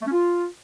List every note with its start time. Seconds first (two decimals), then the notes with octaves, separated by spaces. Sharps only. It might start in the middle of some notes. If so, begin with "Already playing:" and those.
0.01 A3
0.06 C#4
0.12 F4